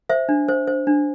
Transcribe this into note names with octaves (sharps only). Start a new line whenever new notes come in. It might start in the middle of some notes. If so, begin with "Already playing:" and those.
C5 E5
D4
C5
C5
D4